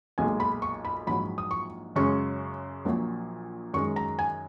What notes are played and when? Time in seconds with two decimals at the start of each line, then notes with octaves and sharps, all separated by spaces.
0.18 B1 A#2 G#3 G#5
0.40 B5
0.62 C#6
0.85 B5
1.07 A#1 G#2 F#3 B5
1.38 D#6
1.51 C#6
1.95 F#2 C#3 G#3 C#4 C#6
2.85 A#1 A#2 F#3
3.74 F#2 D#3 G#3 C#6
3.96 A#5
4.19 G#5